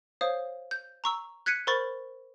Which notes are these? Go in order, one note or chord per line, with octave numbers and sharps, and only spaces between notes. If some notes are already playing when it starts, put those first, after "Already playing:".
C5 C#5 F5 D#6
G6
A#5 C#6 E6
F#6 G#6 B6 C#7 D#7
A#4 C5 B5 C#6 A6